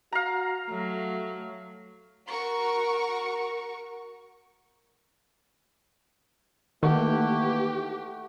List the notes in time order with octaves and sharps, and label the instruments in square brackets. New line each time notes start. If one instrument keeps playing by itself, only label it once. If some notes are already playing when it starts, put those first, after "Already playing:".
[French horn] F#4 [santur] F5 A#5
[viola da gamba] F#3 [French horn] A3
[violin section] F#4 A#4 C#6
[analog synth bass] D#3 [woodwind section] E3 A#3 [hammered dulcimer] A3 F#5 [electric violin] G4